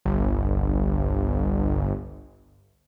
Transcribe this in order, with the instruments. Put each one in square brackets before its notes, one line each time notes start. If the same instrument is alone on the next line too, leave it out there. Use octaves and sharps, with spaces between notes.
[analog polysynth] G1 [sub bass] C2